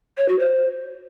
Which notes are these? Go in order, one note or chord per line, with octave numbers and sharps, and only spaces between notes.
C#5
F#4
C5